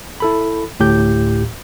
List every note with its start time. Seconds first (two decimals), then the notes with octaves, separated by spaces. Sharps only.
0.20 E4 A4 B5
0.80 D2 A2 G4 G6